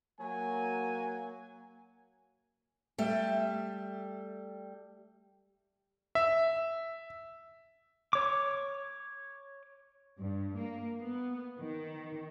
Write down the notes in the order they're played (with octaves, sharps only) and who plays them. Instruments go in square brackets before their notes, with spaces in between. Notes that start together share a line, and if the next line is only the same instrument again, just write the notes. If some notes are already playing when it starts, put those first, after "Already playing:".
[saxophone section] F#3 [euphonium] A#3 [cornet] G#5
[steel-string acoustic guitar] G3 A3 E5
[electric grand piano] E5
[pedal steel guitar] C#5 D6
[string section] G2
A#3
B3
D#3